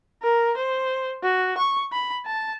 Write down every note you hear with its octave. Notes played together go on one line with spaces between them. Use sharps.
A#4
C5
F#4
C#6
B5
A5